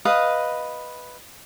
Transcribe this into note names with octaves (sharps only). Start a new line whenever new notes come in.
B4 D#5 F5